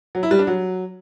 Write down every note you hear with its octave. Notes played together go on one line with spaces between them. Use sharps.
F#3
E4
G3
D4
F#3